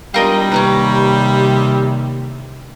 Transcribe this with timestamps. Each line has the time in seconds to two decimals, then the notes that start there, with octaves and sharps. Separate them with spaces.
0.14 E1 G3 F4 A#4 D#5
0.52 D#2 C3 C#4 A#4 B4